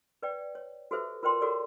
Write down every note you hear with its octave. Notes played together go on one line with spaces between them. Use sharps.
B4 D5 G5
C#5
F#4 G4 A4 B4 C5 E5
F4 A#4 C5 D5 G5 C6
F#4 G4 A4 A#4 C#5 D5